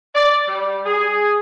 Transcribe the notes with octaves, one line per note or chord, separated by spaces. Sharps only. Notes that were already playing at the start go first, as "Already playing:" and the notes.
D5
G3
G#4